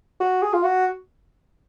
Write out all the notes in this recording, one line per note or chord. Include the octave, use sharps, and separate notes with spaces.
F#4
G#4
F4
F#4